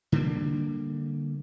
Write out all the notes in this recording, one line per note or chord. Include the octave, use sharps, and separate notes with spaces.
D3 G3 A#3